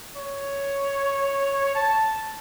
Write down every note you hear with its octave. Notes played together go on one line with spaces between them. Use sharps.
C#5
A5